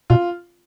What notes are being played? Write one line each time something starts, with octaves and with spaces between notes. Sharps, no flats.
B2 F4